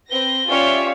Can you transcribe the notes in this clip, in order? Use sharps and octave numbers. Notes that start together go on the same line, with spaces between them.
C4 B4 A#6 G7
C#4 F4 G4 C#5 D5 E5 F5